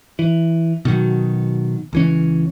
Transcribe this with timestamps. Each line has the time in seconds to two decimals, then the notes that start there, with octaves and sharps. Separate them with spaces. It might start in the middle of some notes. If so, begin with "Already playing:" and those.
0.19 E3
0.85 B2 D#3 F#3
1.93 C#2 E3 C#4